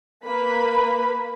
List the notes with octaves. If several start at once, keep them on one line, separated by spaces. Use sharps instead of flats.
A#3 B4 B5